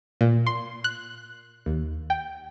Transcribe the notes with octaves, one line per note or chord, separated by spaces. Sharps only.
A#2
C6
F#6
D#2
G5